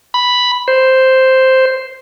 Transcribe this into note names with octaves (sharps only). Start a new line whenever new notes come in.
B5
C5